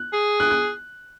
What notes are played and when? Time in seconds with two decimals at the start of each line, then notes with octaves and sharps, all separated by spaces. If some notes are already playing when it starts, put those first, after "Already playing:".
Already playing: F#6
0.13 G#4
0.40 D#6 F#6
0.50 F#6